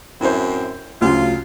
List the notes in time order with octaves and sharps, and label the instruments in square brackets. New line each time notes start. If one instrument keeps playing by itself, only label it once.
[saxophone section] F#2 A2 C4 [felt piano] E4 C5
[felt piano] D2 C#3 F#3 [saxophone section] F4